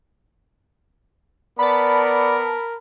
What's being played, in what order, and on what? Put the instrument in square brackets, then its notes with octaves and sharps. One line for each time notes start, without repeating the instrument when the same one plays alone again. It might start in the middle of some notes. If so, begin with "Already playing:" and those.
[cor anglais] B3 [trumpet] A#4 [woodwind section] D5 [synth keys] A5 B5